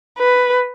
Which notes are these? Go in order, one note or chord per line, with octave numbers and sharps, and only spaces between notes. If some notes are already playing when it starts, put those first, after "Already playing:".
B4